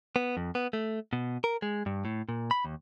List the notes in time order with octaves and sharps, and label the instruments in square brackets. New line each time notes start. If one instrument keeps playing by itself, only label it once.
[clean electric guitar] B3
F2
B3
A3
B2
A#4
G#3
G2
A2
A#2
B5
D#2